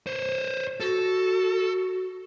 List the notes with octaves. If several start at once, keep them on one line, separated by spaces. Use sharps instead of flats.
C5 C#5
F#4 A4